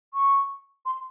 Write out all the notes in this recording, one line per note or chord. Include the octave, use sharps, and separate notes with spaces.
C#6
C6